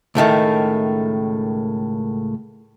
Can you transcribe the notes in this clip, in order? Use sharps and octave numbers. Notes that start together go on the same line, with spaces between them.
C#2 A2 D#3 A3